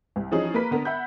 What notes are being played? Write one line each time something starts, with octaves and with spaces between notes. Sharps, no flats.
C2
E3 F3 G3 C#4 D#4 G#4
A#3 A#4 B4 B5 B6
D3 B3 A#4
E5 F#5 B5 G6